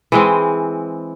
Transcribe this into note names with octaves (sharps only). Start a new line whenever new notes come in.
E3 G#3 C4